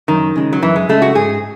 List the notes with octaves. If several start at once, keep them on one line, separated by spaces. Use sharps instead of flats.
F#2 D#3
C#3 G#3
F#3
F#2 E3
G#3
C#3 G#3 A3
F#4
G#2 G#4